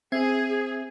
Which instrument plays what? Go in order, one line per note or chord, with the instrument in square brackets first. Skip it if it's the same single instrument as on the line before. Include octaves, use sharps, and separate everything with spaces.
[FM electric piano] C4 E5 G#6 [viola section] G#4